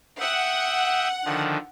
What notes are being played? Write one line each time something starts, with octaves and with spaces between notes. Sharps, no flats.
E5 F#5 G5 D#6
D3 D#3 F3